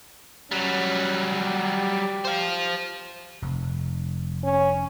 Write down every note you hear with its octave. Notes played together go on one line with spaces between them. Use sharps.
F#3 G3 C#4
G4
C5 F5
F1
C#4